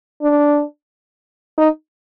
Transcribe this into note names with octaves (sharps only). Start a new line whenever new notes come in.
D4
D#4